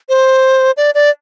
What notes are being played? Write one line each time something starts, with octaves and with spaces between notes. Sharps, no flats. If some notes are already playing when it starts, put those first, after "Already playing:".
C5
D5
D5